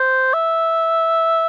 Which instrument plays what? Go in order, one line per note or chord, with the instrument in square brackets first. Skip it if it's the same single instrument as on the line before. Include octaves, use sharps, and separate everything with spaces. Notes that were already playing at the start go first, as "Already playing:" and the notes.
Already playing: [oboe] C5
E5